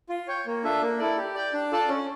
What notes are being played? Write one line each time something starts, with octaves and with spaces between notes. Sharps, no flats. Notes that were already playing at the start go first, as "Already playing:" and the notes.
F4
C#5 G5
A#3
D4 F4 A4 E5
A#3
E4 A4 D5
G4
D5 G5
D4
F4 A4 D5 A5
C#4